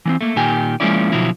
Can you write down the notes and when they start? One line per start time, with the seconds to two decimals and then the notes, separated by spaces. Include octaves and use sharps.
0.05 E3 B3 C4
0.21 A3 A#3
0.36 A#2 D#3 G4 G#5
0.80 F3 G#3 A#3 C#4 E4 D5
1.12 B2 D3 F3 F#3 E4